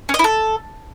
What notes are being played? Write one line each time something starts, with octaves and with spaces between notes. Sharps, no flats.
C#4
D#5
E4
A4